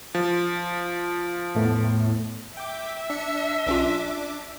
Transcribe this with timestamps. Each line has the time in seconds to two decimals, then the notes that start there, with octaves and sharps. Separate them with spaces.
0.15 F3
1.55 E2 A2 A3 B3
2.57 E5 G5 D6
3.10 D4 C#7
3.66 B1 C#4 D4 F4 D6